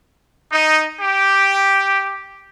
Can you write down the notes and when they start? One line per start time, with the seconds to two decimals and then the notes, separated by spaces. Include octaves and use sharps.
0.51 D#4
0.99 G4